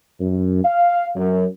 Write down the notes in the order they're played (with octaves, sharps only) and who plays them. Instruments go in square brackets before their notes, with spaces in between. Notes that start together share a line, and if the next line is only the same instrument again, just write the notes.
[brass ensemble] F#2
F5
F#2